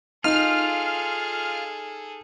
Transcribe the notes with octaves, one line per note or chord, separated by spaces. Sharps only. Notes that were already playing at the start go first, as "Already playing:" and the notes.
D#4 F4 G#4 A4 F6